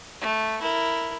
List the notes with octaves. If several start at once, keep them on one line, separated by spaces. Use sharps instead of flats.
A3
E4 A#4